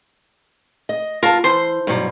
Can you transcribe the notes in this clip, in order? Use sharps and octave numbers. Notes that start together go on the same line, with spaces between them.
D#5
F4 A#4 A5
E3 C5 C6
G2 B2 F#3